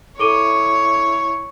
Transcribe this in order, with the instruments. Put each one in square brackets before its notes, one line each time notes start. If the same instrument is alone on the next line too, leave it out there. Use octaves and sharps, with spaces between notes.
[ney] E4 [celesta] A4 D6 D#7 [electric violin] C#5